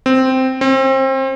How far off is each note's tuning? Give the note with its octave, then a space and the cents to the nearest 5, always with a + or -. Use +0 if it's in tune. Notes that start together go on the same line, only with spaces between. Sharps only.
C4 -5
C4 +30